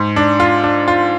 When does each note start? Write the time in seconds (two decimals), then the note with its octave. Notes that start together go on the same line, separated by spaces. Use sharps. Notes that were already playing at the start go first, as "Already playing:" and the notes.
Already playing: G#2
0.16 D4
0.40 F4
0.64 D4
0.88 F4